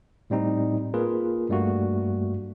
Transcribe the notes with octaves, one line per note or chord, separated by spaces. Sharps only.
A2 G3 C4 D#4
A#3 F4 G#4 A#4 B4
G2 G3 A3 A#3 F#4